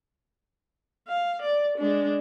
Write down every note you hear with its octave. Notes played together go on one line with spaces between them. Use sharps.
F5
D5
G#3 D4